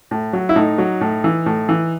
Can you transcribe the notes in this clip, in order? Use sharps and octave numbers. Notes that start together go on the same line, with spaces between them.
A2
F#3
E4
A2 D#4
F#3
A2
E3
A2
E3